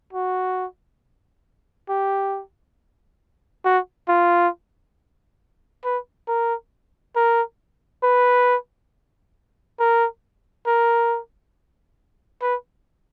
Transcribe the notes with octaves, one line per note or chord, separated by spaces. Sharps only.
F#4
G4
F#4
F4
B4
A#4
A#4
B4
A#4
A#4
B4